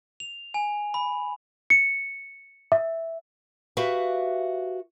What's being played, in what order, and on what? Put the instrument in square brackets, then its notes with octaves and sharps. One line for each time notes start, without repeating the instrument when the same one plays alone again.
[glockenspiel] F7
G#5
B5
[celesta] C#7
E5
[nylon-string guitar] F#4 G4 B4 E5 F5